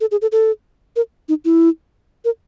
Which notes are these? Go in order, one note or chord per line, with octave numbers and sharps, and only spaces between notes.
A4
G#4
A4
A4
A#4
D#4
E4
A#4